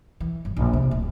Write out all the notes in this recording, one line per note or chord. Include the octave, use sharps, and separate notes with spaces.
E3
G1
A#1
C3
D1